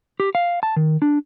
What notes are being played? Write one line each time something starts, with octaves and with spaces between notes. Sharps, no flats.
G4
F5
A5
D#3
D4